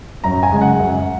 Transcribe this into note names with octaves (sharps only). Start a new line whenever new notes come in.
F#2 A#5
G#5
C#3 G#3
F#5
F#2